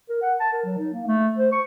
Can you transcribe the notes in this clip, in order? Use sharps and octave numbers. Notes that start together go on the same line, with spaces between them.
A#4
F#5
A5
A#4
F#3
D#4
A#3
A3
C5
C#6